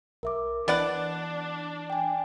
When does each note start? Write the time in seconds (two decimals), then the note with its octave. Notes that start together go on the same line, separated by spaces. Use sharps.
0.23 B1 A#4 E5 D6
0.68 E3 B3 D4 D5 F#5 F#6
1.90 G5 G#5